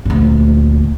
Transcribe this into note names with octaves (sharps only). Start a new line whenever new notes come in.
D2 A#2